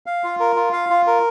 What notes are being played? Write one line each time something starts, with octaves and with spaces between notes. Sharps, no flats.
F5
F4
A#4
F4
F5
F4
A#4